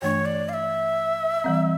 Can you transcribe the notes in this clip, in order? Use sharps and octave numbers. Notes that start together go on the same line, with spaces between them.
G2 E3 A3 D4 C#5
D5
F5
E5
E3 G3 C4